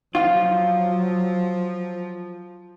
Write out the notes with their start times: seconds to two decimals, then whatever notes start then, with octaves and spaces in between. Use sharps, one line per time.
0.15 F3 F#3 F4